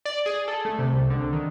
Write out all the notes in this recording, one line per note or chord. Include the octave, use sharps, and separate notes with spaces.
D5
G#4
A4
A3
C3
C2
D3
D#3